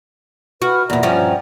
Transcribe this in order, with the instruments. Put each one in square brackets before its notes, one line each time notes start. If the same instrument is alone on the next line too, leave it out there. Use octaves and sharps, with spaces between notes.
[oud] F#4 [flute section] B4 F6
[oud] E2 A#2 [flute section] D5 F#5 A#5
[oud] G2 F3 C#4